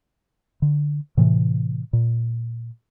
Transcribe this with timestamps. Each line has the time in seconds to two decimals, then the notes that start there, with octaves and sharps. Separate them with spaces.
0.62 D3
1.17 A2 C3 E3
1.93 A#2